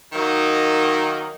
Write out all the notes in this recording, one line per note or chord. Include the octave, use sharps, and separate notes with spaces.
D#3 F#3 A#3 D#4 F#4